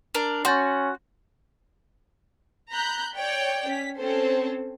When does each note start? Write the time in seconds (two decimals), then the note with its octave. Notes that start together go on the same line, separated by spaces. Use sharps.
0.15 D4 A#4
0.45 C#4 F#4 C6 G6 A6
2.71 A#5 B5 F#6 G6
3.14 C#5 D5 G5
3.66 C#4 B6
3.97 C4 C#4 A4 C5